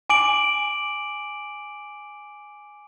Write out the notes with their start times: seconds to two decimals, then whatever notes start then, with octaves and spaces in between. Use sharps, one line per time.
0.10 G#5 D6 D7 F#7